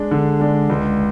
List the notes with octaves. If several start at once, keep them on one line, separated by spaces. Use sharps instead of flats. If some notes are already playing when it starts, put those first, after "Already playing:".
Already playing: G#3 D4
D3
G#3 D4
C#2